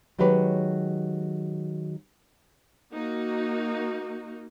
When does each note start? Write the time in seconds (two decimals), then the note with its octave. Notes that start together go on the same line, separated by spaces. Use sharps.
0.19 D#3 F#3 G#3 G4 B4 C#5
2.93 A#3 D#4 F#4